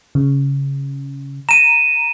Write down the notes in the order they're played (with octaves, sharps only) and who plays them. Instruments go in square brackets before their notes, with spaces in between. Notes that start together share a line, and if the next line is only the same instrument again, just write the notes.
[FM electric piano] C#3
[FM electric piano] A#5 [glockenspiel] D#7 E7